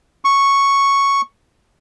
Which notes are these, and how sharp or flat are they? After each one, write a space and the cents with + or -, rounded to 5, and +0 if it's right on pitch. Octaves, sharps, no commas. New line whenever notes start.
C#6 +0